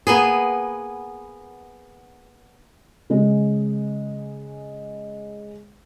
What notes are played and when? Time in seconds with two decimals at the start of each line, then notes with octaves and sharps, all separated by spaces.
0.07 A#3 B3 G#4
3.10 C#3 G#3